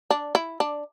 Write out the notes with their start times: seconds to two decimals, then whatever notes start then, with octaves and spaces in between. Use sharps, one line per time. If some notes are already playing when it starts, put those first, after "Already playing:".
0.10 D4
0.35 E4
0.60 D4